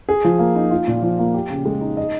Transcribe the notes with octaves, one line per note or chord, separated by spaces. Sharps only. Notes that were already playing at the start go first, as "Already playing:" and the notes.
G#4
F3
A#3
D#4
F4
A#2
F3
A#3
G4
C#3
G#3
D#4
D#5